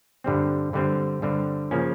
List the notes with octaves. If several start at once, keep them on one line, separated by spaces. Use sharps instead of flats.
G2 D3 G3 C4
G2 D3 G3 C4
G2 D3 G3 C4
C#3 F3 A#3 C#4